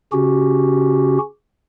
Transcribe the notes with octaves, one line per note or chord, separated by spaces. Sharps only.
C#3 C#4 F#4 G4